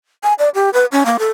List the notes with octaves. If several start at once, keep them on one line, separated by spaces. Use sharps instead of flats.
G#5
D5
G4
B4
C#4
A#3
A4